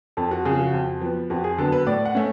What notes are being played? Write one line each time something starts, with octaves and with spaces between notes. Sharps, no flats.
F2 A4
F#4
C#3 F3 G#4
F#4
F2
F3 B3
F2 F#4
G#4
D3 F#3 B3 A4
B4
A2 D5
F#5
A3 C#4